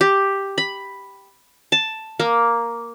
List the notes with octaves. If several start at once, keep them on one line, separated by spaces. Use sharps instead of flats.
G4
B5
A5
A#3